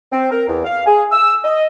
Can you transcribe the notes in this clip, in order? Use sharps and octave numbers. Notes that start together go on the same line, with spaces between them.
C4
A#4
E2
F5
G#4
E6
D#5